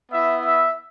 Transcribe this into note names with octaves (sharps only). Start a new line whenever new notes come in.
B3 E4 E5
E5